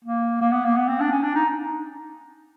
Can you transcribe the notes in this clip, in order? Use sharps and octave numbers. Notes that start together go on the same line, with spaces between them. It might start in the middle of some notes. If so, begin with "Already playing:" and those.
A#3
A#3
B3
A#3
B3
C4
D4
C#4
D4
D#4